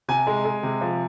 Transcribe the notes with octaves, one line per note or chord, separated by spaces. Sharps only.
C3 G#5
G#3
G#3
C3
F3